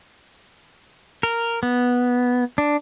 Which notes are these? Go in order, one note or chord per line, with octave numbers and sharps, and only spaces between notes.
A#4
B3
D4